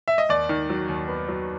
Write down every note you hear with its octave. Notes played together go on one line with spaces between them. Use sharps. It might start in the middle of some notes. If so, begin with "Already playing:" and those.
E5
D#5
D#2 D5
D#3
F#3
D#2
B3
F#3